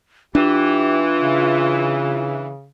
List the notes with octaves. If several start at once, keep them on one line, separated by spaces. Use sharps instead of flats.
E3 D4 F4 G4
C#3